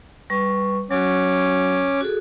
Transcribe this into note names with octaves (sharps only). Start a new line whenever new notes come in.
G3 B4 C#6
F#3 C#4 F#4 C#5 D6
F#4 G#4 A4